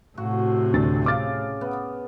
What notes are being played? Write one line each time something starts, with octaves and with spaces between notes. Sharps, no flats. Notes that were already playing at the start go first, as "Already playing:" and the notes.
A2 C3 F#4
D2 D3 A6
C#3 D6 F6 A6
B3